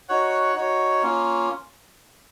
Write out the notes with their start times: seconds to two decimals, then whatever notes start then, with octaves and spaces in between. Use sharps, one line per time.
0.09 D#4 F#4 C#5 F#5
0.56 D#4 F#4 C#5
1.03 A#3 C#4 F4